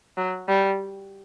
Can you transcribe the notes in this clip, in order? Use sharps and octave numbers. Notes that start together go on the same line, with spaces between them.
F#3
G3